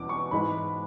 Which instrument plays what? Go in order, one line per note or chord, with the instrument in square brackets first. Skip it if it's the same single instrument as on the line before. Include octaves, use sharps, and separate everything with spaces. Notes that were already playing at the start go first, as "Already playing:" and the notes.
Already playing: [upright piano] E2 B2 D6
C#6
G#2 E3 G#3 B5